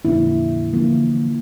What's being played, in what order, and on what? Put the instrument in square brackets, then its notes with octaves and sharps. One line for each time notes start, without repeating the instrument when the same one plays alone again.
[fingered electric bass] F2 A#2 D3 [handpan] E4
[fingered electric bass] D3 E3 F3 [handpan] A#3